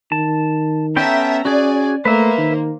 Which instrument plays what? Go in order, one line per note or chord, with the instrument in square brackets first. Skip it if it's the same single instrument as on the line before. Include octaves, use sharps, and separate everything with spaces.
[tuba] D#3 [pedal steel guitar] A5
[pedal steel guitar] B3 C#4 G5 [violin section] A4 E5 A#5
[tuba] C#4 [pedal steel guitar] F#4 G#4 [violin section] D5 G#5
[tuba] A3 [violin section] A#3 C5 [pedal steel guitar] B4 E5
[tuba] D#3